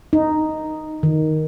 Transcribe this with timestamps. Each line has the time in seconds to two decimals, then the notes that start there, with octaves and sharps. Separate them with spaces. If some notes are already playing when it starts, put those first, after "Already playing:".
0.13 D#4
1.03 D#3